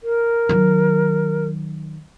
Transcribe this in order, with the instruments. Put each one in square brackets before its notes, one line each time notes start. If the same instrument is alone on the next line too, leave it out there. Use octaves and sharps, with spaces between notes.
[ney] A#4
[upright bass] D#3 F#3